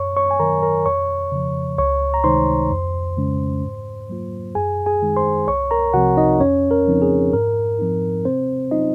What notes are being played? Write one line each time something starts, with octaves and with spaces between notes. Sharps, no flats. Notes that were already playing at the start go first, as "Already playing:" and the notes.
Already playing: F#2 C#5 C#6
C#5 C#6
G#5
D#3 F#3 A#4 A#5
A#4 A#5
F2 C#5 C#6
C#3 F3
C#2 C#5 C#6
A#5
C3 D#3 G#3 D#4 C5 C6
F2
C#3 G#3 C#4
G#2
F#3 A#3 F4
F#2 G#4 G#5
G#4 G#5
D#3 G#3 D#4
C5 C6
C2 C#5 C#6
A#4 A#5
C3 F3 C4 F#4 F#5
D#4 D#5
F2 C#4 C#5
A#4
C#3 F3 C4 D#4
G#4
G#2 A#4
F3 C4 D#4
C3 C4 C5
F#3 C#4 D#4 F4 D#5